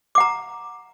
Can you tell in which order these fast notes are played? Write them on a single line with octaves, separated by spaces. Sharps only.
D6 F#5 A#5